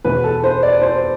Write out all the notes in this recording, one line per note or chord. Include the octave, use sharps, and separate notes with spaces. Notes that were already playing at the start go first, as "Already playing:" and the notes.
E2 B2 B4
A4
C5
D5
C5